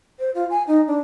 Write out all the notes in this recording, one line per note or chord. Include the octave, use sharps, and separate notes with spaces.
C5
F4
G#5
D#4
D4